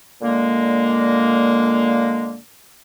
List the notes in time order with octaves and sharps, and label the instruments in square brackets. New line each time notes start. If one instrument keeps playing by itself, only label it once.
[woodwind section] A#2 D3 G#3 A#3